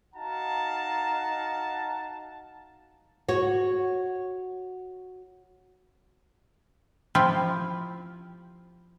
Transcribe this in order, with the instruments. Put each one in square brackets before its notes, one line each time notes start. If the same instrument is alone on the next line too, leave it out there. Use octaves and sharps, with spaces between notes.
[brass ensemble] D#4 F#4 F5 F#5 A5 A#5
[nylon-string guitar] F#4 C#5
[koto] F3 C4 E4 F4 G4